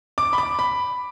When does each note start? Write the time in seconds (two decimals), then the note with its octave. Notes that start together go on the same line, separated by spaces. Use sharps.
0.18 D6
0.33 B5
0.38 D6
0.59 B5